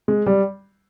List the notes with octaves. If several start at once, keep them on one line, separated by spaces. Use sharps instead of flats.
G#3
G3